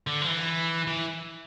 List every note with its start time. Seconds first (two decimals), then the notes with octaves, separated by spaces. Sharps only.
0.07 D3
0.21 F3
0.27 E3
0.87 E3